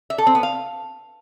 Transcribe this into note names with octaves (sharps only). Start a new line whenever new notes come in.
E5
A4
C4
B3
F5